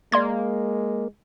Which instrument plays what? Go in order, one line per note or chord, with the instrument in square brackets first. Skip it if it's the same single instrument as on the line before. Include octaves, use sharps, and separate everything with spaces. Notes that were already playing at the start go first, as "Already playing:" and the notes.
[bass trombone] G#3 [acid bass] A#3 [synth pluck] D5 C6 G#6